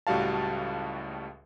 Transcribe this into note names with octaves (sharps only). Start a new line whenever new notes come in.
C#2 A2 G3 F#4 F5 A5